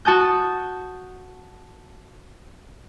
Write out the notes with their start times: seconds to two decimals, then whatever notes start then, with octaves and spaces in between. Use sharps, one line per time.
0.05 F#4 A5 D#6 G6